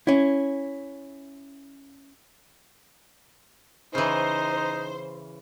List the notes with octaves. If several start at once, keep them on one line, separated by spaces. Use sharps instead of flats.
C#4 E4
C#3 E3 D#4 C5